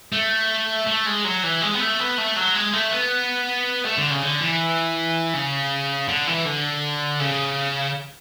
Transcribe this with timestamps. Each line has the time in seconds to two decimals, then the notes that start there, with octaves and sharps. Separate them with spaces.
0.12 A3
0.87 A3
1.06 G#3
1.25 F#3
1.43 E3
1.62 G#3
1.74 B3
1.80 A3
2.00 B3
2.18 A3
2.36 F#3
2.55 G#3
2.73 A3
2.92 B3
3.85 A3
3.98 D3
4.10 C#3
4.22 D3
4.41 E3
5.34 C#3
6.08 D3
6.27 E3
6.45 D3
7.20 C#3